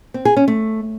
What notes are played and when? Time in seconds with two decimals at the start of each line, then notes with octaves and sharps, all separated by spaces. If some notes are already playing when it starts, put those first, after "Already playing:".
0.14 C4
0.25 G#4
0.37 C#4
0.48 A3